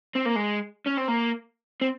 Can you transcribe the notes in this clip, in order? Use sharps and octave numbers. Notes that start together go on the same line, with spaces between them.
C4
A#3
G#3
C#4
C4
A#3
C4